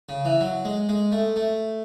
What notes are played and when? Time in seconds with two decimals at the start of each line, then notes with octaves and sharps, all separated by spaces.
0.09 C#3
0.25 E3
0.41 F#3
0.65 G#3
0.89 G#3
1.12 A3
1.36 A3